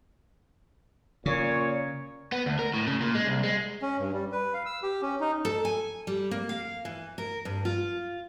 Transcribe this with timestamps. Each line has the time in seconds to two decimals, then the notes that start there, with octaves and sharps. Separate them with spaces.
1.26 A#2 C#3 C#5
2.32 B3
2.46 D2
2.59 A#4
2.74 A2
2.87 C#3
3.01 A#2
3.15 G#3
3.26 C2
3.44 G#3
3.82 C#4
3.99 G2
4.13 G3
4.32 B4
4.54 F5
4.66 E6
4.83 G4
5.02 C#4
5.21 D#4
5.45 A4
5.65 G#5
6.07 G3
6.31 A#3
6.49 F5
6.85 E3
7.18 A#4
7.45 G2
7.65 F4